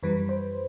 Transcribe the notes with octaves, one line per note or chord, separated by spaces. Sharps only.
F#2 E3 G3 B4
C5